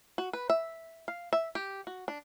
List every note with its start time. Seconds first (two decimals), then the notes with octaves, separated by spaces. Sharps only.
0.18 F#4
0.33 B4
0.50 E5
1.08 F5
1.33 E5
1.55 G4
1.87 F#4
2.08 D4